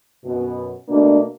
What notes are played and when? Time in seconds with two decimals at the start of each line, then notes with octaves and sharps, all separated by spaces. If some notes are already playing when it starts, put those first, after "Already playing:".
0.25 F#2 B2
0.89 B2 A3 A#3 D4